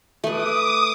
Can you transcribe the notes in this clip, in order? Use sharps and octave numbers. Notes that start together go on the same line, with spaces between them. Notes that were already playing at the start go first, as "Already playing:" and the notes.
A3 B4 D6 D#6